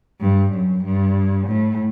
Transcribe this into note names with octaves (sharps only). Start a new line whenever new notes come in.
G2
F#2
G2
A2